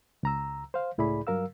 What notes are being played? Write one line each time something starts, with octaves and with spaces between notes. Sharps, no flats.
C#2 A#5 E6
C5 F5
C#2 A2 E4 G#4 D5 B5
G2 F#3 A#4 F5 E6